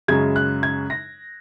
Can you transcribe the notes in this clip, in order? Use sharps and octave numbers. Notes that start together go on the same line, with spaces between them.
F#2 C#3 G#3 G#6
F#6
G#6
A#6